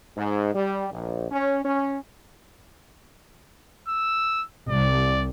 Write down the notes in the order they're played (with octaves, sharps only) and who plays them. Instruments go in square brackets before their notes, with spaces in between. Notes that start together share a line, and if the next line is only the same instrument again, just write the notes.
[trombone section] G#2
G3
A#1
C#4
C#4
[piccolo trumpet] E6
[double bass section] C2 [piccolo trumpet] D5